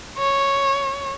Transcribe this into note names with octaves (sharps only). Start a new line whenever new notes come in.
C#5